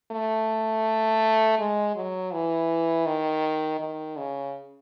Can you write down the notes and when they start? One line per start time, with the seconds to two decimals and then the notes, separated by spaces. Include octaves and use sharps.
0.12 A3
1.59 G#3
1.95 F#3
2.33 E3
3.06 D#3
3.80 D#3
4.17 C#3